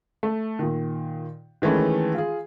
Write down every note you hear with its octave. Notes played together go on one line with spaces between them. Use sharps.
A3
A#2 D#3
D#3 E3 G#3 A3 C#4
F4 G#4